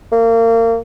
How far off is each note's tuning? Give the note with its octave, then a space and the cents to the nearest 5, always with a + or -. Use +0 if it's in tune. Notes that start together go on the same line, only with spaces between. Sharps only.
A#3 -30